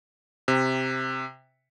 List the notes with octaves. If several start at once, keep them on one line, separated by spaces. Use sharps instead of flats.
C3